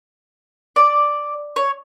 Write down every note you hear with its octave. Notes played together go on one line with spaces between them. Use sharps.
D5
C#5